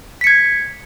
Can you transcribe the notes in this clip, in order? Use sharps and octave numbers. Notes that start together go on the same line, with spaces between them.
G#6 B6 C#7